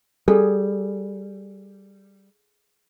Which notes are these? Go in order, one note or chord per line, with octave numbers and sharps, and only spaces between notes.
G3 G#4 A4